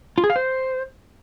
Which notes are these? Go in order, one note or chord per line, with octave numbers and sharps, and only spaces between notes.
F4
G#4
F5
C5